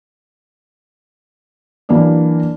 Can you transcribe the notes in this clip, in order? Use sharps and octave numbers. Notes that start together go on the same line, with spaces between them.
E3 F#3 A#3 D4 D5